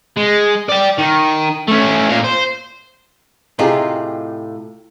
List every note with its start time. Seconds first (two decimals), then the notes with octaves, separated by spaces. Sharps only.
0.17 G#3
0.69 D5 G5
0.98 D#3
1.68 A3 C#4
2.09 A#2 F5
2.24 C5
3.59 A2 C3 D#4 F4 G4 G#4